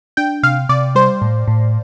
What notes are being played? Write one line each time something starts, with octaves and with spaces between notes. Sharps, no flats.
D4 G5
C3 F5
C3 D5
G3 C5
A2
A2